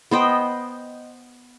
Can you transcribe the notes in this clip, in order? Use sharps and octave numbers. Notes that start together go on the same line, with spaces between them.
B3 C5 D#5 G5